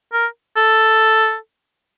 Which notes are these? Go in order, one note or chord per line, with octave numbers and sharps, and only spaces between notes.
A#4
A4